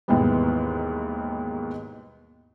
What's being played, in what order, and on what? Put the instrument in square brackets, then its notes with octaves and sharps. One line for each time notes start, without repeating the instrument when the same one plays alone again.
[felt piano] D#2 G#2 B2 E3 G3 B3